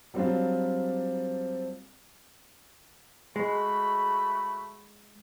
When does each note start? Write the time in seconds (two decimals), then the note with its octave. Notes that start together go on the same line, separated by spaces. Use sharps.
0.14 F#3 G3 A#3 C4 D4 F4
3.36 G#3 A3 F#4 B5